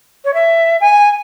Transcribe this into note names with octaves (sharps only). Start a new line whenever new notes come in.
C#5
E5
G#5